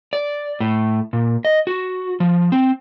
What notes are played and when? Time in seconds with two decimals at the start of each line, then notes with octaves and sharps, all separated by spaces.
0.13 D5
0.60 A2
1.13 A#2
1.45 D#5
1.67 F#4
2.20 F3
2.52 C4